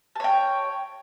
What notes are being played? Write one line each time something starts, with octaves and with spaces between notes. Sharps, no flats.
C#5 G5 A5